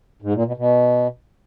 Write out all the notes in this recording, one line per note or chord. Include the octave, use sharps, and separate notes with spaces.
G#2
A#2
B2
B2